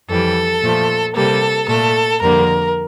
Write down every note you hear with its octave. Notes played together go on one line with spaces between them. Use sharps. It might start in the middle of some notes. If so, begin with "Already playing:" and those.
F2 E3 G3 A4
A#2 F3 A3
C3 G3 A#3 A4
A#2 A3 A4
F2 D3 G3 A#3 A#4